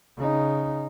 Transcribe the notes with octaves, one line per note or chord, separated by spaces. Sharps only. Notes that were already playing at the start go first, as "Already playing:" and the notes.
C#3 D#4